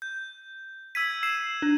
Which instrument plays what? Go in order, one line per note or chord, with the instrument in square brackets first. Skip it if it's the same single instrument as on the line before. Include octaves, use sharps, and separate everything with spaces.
[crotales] G6
[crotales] E6 G#6 D#7 [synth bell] B6
[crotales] E6 E7 [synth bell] C7
[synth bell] D4